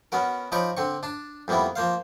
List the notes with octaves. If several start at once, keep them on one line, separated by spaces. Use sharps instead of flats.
B3 C#4 F#4 A#4
F3 D#4 C#5 B5 C#6 D6
D3 C4 C#6
D4 A5
F2 G3 A#3 B3 E4
F3 A#3 C5 F5